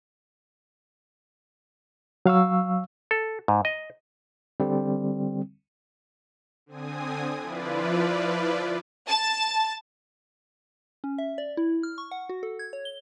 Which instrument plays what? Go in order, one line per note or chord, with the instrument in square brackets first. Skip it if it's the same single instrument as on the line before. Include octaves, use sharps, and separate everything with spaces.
[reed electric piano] F#3 F5 C#6 E6
[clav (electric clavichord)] A4
G#2
D#5
[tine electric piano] D3 G3 C4
[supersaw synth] D3 C4 G#5 D#6
F3 E4 F4 B4 D5
[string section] A5
[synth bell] C#4
E5
D5
E4
F6
C#6
F#5
F#4
A4
G#6
C#5
G7